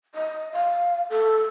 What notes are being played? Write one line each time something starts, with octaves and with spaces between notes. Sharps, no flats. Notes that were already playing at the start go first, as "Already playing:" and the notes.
D#5
F5
A4